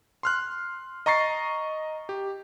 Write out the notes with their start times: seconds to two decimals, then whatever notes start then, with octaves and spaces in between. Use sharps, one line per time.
0.23 C6 F6 F#6
1.06 D#5 A#5 C#6 A6 C7
2.09 G4